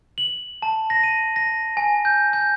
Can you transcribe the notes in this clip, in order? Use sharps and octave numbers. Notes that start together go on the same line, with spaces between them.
F#7
A5
A#6
D#7
A#6
G#5
G6
G6